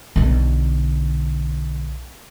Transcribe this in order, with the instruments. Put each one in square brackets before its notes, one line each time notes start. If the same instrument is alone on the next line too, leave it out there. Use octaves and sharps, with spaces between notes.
[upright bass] B1 D3